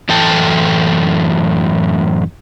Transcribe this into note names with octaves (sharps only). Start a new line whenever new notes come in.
F#2 A2 E3 A4 G5 A5